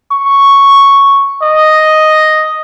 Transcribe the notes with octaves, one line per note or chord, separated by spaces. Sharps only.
C#6
D#5